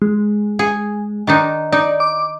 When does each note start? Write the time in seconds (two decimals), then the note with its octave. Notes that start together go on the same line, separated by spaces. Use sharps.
0.02 G#3
0.59 G#4
1.27 D#3 D4 D#4
1.72 D#4 D5
2.00 D6